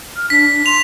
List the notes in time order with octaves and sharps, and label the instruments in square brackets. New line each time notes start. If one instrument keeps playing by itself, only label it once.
[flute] F6
[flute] D4 [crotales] B6
[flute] C6 [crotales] F7